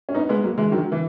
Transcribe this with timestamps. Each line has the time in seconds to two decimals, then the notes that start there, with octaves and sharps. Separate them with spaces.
0.09 C#4
0.15 B3 D#4
0.29 G#3 B3
0.44 F#3 A#3
0.58 E3 G#3
0.72 D#3 F#3
0.92 E3